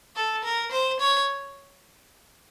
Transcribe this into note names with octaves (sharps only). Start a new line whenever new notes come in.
A4
A#4
C5
C#5